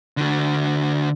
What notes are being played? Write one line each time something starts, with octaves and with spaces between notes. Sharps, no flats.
D3 F#4